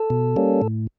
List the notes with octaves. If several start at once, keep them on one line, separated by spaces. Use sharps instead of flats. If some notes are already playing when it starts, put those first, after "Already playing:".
Already playing: A4
B2
G3 A#3 C#4
A2